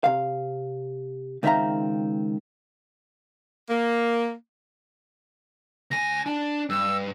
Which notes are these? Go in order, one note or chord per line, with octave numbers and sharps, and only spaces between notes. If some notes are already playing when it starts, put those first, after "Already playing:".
C3 F5
C#2 D#3 C4 E5 F5 A#5
A#3
D2 G#5 A#6
D4 A5
G2 E6